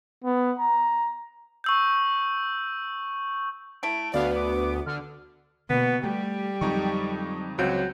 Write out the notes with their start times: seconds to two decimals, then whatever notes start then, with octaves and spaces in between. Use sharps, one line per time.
0.24 B3
0.59 A#5
1.64 C#6 E6 G6
3.83 A3 E4 D7
4.14 D2 B3 F#4 D5 F5
4.35 D6
4.86 D3 F6
5.70 B2 D3 A#3 B3
6.04 G3 A3 G4
6.61 F2 D3 F#3 G#3 D#4 C#6
7.58 C#2 F#3 C4 G6